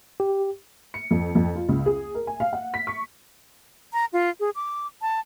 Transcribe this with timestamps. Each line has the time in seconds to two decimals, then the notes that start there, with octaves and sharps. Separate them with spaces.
0.20 G4
0.94 C#7
1.11 F2
1.35 F2
1.55 F4
1.69 C#2
1.86 G#4
2.15 A#4
2.27 G#5
2.40 F5
2.53 F#5
2.74 B6
2.87 C#6
3.93 A#5
4.13 F4
4.40 G#4
4.55 D6
5.02 A5